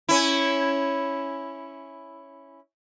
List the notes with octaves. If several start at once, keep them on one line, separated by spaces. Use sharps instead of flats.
C#4 E4